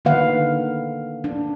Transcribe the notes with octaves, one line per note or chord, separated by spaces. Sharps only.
D3 D#3 A#3 B4 F5 F#5
D4